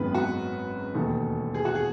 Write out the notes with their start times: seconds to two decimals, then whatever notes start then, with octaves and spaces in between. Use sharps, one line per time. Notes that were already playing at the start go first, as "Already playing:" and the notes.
Already playing: G#1 F#2 D#3 G#3 B3 B4
0.14 F#4
0.94 E1 D#2 D#3 A3
1.54 G#4
1.65 F#4
1.75 G#4